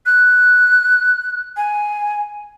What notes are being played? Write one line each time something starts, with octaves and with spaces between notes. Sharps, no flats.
F#6
G#5